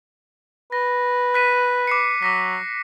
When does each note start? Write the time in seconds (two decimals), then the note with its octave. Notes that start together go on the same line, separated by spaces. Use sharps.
0.72 B4 A#6
1.34 F#6 B6 D#7
1.87 D6 C7 C#7
2.23 F#3 D6 A#6 B6